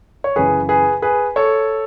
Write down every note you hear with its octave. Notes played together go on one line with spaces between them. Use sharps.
C#5
F#2 C#3 E3 G#4 B4
G#4 B4
G#4 B4
A4 C#5